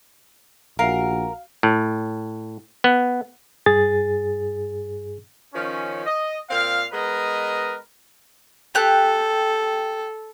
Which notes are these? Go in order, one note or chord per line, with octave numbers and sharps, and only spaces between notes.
A#1 F#4 A#4 F5 F#5 G#5
A2
B3
G2 G#4 A6
D#3 F3 C#4
D#5
A#2 C4 F5
G#3 B3 A#4 B4 D#5
G4 A4 F#6